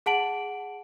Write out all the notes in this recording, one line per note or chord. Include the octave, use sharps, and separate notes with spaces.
G#4 F#5 A5 D7 F#7